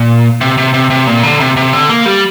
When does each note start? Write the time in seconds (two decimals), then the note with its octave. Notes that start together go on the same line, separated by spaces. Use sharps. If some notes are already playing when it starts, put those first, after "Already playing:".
Already playing: A#2
0.41 C3
0.58 C3
0.74 C3
0.90 C3
1.07 A#2
1.23 D3
1.40 C3
1.57 C3
1.73 D3
1.89 A#3
2.06 G3